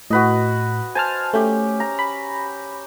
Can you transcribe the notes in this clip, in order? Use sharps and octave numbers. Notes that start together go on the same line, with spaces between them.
A2 F#4 B4 D#5
C5 G#5 A5 F6
A3 C#4 G4
A#5
B5